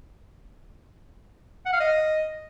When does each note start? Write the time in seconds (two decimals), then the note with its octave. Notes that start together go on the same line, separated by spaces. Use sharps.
1.65 F#5
1.73 F5
1.80 D#5